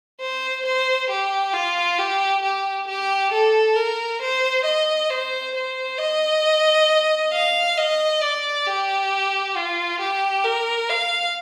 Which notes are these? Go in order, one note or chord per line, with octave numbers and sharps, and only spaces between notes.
C5
C5
G4
F4
G4
G4
G4
A4
A#4
C5
D#5
C5
C5
D#5
F5
D#5
D5
G4
F4
G4
A#4
F5